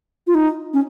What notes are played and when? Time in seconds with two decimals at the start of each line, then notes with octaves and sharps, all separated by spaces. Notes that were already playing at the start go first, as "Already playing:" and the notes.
0.27 F4
0.35 D#4
0.73 C#4